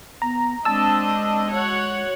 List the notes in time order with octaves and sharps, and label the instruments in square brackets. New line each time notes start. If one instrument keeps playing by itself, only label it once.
[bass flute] B3 [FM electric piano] A#5
[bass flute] G#3 [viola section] C4 D4 D#5 [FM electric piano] A5 E6
[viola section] F#4 C#5 F#5